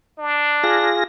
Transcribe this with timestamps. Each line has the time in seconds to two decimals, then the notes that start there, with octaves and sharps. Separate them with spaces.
0.18 D4
0.64 F4 G#4 A#6